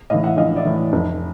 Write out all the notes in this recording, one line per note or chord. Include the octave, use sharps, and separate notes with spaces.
A2 E3 D#5 F5
E5 F#5
A#1 D#5 F5
D5 E5
A2 E3
F1